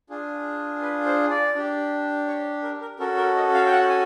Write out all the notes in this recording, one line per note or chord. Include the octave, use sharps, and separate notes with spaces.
D4 F4 G#4
B4
C5
D5
D4 G4
C#5
A#4
A#4
C#4 F#4 A4 A#4
A#4
D#5
F5
G5
F#5
G#5